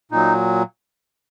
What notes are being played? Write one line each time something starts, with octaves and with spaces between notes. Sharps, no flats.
A#2 F#3 D#4